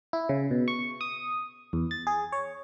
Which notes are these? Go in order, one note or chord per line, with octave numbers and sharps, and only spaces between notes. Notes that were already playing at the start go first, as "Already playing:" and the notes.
E4
C#3
B2
C#6
D#6
E2
A6
G#4
C#5